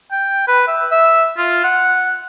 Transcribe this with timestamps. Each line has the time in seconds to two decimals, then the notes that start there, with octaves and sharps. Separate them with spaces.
0.12 G5
0.48 B4
0.68 E5
0.91 E5
1.38 F4
1.64 F#5